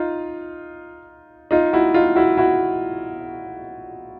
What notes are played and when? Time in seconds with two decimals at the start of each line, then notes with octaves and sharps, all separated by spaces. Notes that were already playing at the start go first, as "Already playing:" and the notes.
Already playing: D#4 F4
1.51 D#4 F4
1.73 E4 F#4
1.94 D#4 F4
2.16 E4 F#4
2.37 E4 F#4